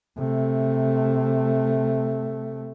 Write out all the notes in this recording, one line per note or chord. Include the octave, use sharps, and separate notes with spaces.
C3 A3